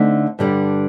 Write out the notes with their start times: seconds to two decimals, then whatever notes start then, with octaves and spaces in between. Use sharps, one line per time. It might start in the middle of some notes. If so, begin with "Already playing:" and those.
Already playing: D3 A3 C4 D#4
0.39 G2 D3 G3